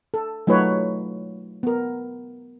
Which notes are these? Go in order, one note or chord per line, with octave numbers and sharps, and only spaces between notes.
A4
F#3 A3 D#4 F4 B4 C#5
B3 A#4